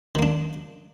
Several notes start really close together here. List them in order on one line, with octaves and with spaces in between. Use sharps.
D#3 A#3 D4